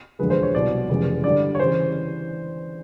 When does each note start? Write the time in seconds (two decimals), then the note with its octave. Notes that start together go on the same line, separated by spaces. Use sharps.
0.19 E1 D2 D3 F3 G#3 B4
0.30 C5
0.43 C#5
0.54 C2 B2 F#3 D5
0.89 F1 F2 C#3 E3 G#3
1.24 G2 D3 G3 D5
1.55 C#5
1.59 C#3 E3 C5